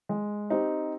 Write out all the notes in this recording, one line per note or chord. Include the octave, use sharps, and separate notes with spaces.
G#3
C4 D#4 G4